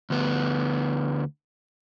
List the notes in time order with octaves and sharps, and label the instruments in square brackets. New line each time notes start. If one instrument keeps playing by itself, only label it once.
[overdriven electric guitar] D2 B3